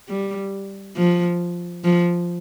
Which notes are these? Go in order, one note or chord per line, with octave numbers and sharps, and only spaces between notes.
G3
F3
F3